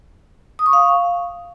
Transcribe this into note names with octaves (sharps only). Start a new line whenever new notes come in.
D#6
C#6
F5